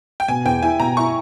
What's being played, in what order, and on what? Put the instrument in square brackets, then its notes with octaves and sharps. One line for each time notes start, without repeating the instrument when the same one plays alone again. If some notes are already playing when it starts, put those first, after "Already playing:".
[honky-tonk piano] G5
[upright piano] B2 [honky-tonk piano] G#5
[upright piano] E2 [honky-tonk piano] G5
[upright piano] E4 [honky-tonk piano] G#5
[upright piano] B2 [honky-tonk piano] A#5
[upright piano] E4 [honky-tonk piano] C#6